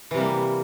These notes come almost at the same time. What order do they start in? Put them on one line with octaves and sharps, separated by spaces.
E3 C3 G3 A#3